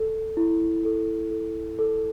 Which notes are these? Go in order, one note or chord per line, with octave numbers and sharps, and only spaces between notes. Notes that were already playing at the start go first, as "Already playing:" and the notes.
Already playing: A4
E4
A4
A4
A4